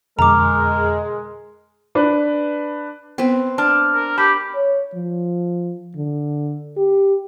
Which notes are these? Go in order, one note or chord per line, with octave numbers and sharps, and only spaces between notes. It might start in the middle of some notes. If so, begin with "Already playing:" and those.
F2 B2 D3 G#3 A#4 A#5 D6
D4 B4
B3 C4 B4
D4 A5 F6
A#4
G4 A5 B5
C#5
F3
D3
G4